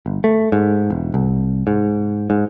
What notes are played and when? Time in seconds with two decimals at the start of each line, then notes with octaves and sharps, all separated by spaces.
0.06 G1
0.24 A3
0.52 G#2
0.90 E1
1.14 C2
1.67 G#2
2.30 G#2